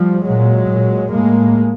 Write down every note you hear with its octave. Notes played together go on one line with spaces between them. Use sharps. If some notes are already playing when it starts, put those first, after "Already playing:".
Already playing: F3 G3
A#2 F#3 G#3
A#2
A2 G#3 A#3